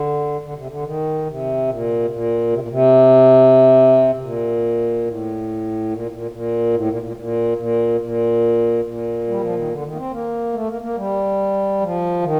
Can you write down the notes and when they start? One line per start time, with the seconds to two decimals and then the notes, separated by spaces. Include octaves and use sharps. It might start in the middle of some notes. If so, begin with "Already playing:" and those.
Already playing: D3
0.41 D3
0.54 C3
0.67 D3
0.84 D#3
1.26 C3
1.67 A#2
2.05 C3
2.10 A#2
2.52 C3
2.60 A#2
2.68 C3
4.15 C3
4.20 A#2
5.05 A2
5.90 A#2
6.11 A#2
6.31 A#2
6.74 A2
6.88 A#2
7.02 A#2
7.16 A#2
7.58 A#2
8.01 A#2
8.85 A#2
9.28 G3
9.41 F3
9.55 D#3
9.69 D3
9.83 D#3
9.91 A#3
9.97 C4
10.11 A#3
10.53 A3
10.68 A#3
10.81 A#3
10.95 G3
11.80 F3
12.22 D#3